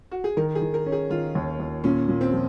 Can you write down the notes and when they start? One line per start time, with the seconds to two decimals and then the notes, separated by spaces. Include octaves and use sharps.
0.11 F#4
0.24 G#4
0.37 D#3 A#4
0.55 G#4
0.62 D#3
0.74 A#4
0.86 C#4
0.92 G#4
1.10 D#3 F4
1.35 D#2
1.60 D#2
1.84 A#2 C#4
2.09 A#2
2.21 C4
2.33 F3